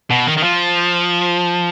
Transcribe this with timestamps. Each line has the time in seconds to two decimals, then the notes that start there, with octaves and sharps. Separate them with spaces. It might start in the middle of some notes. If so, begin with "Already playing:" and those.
0.11 B2
0.27 D#3
0.37 D#3
0.43 F3